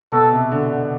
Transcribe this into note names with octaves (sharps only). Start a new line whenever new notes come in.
B2 A4
C3
D3
D3